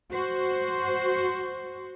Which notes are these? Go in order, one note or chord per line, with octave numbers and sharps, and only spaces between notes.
F#4 C5